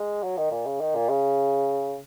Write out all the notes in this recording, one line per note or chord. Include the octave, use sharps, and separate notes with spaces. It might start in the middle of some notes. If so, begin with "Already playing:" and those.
Already playing: G#3
F#3
D#3
A#2
C#3
D#3
A#2
C#3